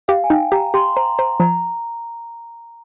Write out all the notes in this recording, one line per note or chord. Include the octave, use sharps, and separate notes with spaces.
G4 F5
G#5
D#4 G5
G4 A#5
G4 C6
C5 A#5
C5 A#5
F3 A#5